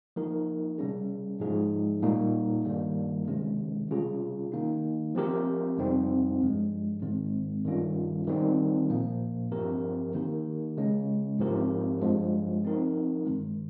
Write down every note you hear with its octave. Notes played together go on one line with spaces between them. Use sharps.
F3 A#3 D#4 A#4
C3 G3 C#4 G#4
G#2 F3 G#3 D#4 G#4
A#2 G3 A#3 D#4
G2 D#3 G3 A#3
C3 D#3 G#3 C#4
C3 G3 C#4 F4 G#4
D#3 A#3 D#4
F3 C4 G4 A#4
F2 C3 G3 C4 D#4
G2 F3 G#3
G#2 D#3 G#3 C4
G2 D#3 G3 C#4 F4
D#3 G3 C4 D#4
A#2 F3 A#3
G2 F3 C4 G4 A#4
D#3 A#3 D#4 G4 A#4
C#3 G#3 C#4
G#2 F3 C4 G4 A#4
G2 F3 G#3
F3 C4 D#4 A#4
G2 D#3 G#3